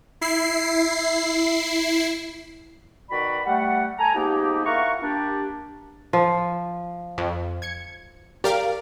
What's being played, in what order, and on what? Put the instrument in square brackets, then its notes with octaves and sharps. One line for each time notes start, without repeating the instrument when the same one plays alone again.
[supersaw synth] E4 C7
[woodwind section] B2 D#3 F#4 D5 B5
G3 A3 F#5
A4 G#5 A#5
F3 G#3 A#3 B3 D#4 G4
E4 F4 A#4 F#5 A#5 C#6
A#3 D4 G4
[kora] F3
[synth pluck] F2
G#6 C#7
[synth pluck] G4 A#4 F5 [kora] D5